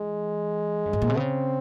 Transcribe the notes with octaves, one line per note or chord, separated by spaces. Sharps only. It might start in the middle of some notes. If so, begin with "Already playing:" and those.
Already playing: E3 G#3
G2
G#2
A#2
C3
C#3 C4